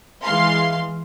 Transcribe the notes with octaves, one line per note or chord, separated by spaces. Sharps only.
E3 G#3 F5 C6